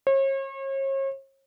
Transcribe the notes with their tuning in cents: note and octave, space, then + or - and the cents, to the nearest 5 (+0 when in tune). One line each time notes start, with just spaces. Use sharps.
C#5 -40